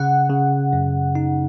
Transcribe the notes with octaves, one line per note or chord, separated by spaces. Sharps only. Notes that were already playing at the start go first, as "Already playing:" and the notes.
Already playing: C#3 F#5
C#3
F#2
D#4